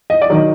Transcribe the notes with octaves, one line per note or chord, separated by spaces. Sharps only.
D#5
D5
D#3 F#3 D#5